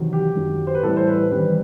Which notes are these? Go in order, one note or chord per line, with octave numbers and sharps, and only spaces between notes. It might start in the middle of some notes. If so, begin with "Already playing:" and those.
Already playing: E2 C3 D#3 F#3
G4
F#2 D#3 F#3
C5
B4
A2 E3 G3 C4 A4
C5
B4
E2 D#3 G3 C4 B4